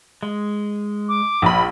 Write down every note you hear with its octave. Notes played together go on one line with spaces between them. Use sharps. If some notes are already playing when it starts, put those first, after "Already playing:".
G#3
D6
A#1 B5 D#6